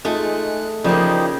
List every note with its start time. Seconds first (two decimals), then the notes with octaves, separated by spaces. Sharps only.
0.05 G#3 A3 D#4 F4 G#4 F#6
0.84 C#3 F3 A#3 D#4 E4 G4 C5 D5